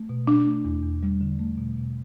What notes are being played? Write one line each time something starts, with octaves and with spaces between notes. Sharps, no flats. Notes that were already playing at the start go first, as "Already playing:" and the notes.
Already playing: A3
B2
B2 D4
A3
E2
E2
G3
D3
A3
B2
B2